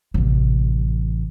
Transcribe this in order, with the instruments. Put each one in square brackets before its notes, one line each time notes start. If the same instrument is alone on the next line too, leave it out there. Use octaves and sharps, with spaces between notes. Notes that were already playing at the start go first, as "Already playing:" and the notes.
[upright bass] A1 C3